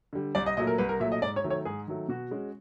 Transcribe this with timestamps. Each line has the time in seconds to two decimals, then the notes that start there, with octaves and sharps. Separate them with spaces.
0.13 D3 G3
0.35 C2 D5
0.46 D#5
0.57 A#2 F#3 A3 D#5
0.67 A#4
0.78 C2 B4
0.89 A#4
1.00 A#2 F#3 A3 E5
1.12 D#5
1.22 G#2 D5
1.36 C#5
1.44 D#3 F#3 A3
1.50 C#5
1.65 G#2 G#4
1.87 D#3 F#3 A3
2.08 B2 F#4
2.31 G#3 C#4